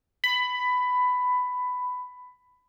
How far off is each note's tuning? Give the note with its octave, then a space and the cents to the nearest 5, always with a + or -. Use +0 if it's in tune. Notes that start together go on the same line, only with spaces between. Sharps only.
B5 +15